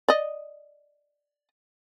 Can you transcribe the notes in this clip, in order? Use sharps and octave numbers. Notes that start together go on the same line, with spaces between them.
D5 D#5